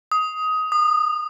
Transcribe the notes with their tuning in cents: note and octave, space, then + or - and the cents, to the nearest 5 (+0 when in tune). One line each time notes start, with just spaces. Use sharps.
D#6 +15
D#6 -30